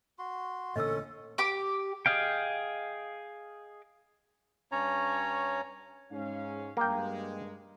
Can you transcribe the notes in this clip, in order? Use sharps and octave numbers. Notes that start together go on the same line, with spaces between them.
F#4 C6
A1 A#2 D3 C#4 A4 D#5 E6
G4 D6
G#4 D#5 F5 G5
G2 C#4 C#5 A#5
G#2 C#4 F5
G2 G#3 A#3 G5